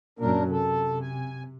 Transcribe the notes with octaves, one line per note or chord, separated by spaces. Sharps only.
F#2 A#2 D4 A#4
C3 A4
G#5